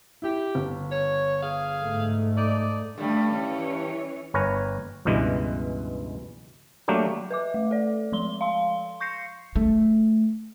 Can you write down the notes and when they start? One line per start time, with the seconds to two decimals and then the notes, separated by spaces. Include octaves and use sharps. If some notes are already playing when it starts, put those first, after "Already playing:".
0.22 E4 G4
0.55 G1
0.91 C#5
1.42 G#4 F5
1.83 G#2 A3
2.35 D#4 D5
2.98 G2 D3 G3 A3
3.31 E3 C#4 C#5
4.34 G1 A#4 B4 C#5 G#5 A#5
5.05 C#2 G2 B2 E3 G#3
6.88 F#3 A3 A#3 D4 G4
7.31 B4 E5 D6
7.54 A3
7.71 A4 D5
8.12 F3 G#3 C6 G7
8.41 F5 C6
9.00 C#6 G6 A#6 C7 C#7
9.56 A3